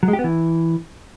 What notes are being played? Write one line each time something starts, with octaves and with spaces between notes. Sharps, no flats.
F#3
G#3
G4
B3
E3